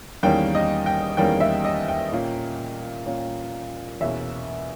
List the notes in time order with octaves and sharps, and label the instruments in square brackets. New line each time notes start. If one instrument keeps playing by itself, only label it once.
[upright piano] E2 D#3 G3 A#3 C#4 G5
D#5
G5
E2 D#3 G3 A#3 C#4 G5
E5
D#5
G5
A#2 A#3 C#4
A#2 A#3 C#4
E2 B2 A#3 C#4 E5